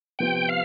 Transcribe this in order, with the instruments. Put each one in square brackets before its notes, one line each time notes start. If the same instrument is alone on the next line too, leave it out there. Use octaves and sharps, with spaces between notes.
[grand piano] C3 F3 B3 F4 [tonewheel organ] G5
[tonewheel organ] F5